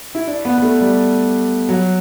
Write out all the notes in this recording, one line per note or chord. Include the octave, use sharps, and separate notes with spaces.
E4
D4
B3
B3
A3
G3
F#3